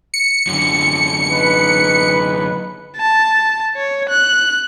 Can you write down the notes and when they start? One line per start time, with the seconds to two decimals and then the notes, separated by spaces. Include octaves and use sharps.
0.14 C#7
0.47 F#2 D3
1.31 D#4 B4
2.97 A5
3.76 C#5
4.09 F#6